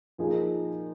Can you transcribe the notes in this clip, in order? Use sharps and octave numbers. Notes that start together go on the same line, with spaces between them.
A#2 F3 A#3 D#4 G#4